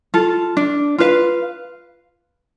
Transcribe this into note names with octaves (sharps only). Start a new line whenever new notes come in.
F4 A4
D4
F4 B4 F5